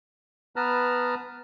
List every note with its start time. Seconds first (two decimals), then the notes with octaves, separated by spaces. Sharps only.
0.56 B3 B4 A5 A#5 F6